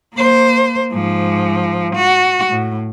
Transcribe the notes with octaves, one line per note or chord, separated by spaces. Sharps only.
A#3 C5
G#2 F3
F#4
A2